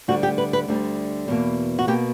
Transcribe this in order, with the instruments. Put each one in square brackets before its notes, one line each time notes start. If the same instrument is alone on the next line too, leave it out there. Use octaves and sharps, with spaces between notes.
[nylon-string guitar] D2 D3 G3 F#4
G4
B4
B4
D2 D3 G3
E2 B2 A#3
F#4
B2 A#3 G4